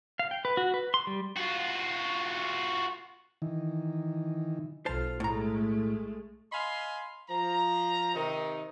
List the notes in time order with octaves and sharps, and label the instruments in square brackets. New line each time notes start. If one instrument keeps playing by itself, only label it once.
[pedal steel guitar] F5
G5
B4
F#4
B4
C6
G3
[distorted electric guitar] F4 F#4
[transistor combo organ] D#3 E3
[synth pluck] B1 F6 [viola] F4 A4 [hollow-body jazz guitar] C5 A5
[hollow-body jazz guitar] A2 A#5 [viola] G#3 A3
[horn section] D#5 F5 G#5 B5 C6
F3 A#5
C3 D#3 D#4